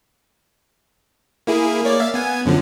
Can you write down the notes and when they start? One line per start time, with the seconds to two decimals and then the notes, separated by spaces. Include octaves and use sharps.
1.47 A#3 E4 G#4
1.84 A#3 C#5 D5
2.00 E5 F5 A6
2.14 B3 G#5
2.46 F#2 D3 F3